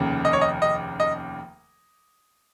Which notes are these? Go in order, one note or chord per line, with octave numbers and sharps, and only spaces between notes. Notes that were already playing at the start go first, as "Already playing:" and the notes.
Already playing: F1 D#2 C#3
D#5
C#5
D#5
D#5
D#5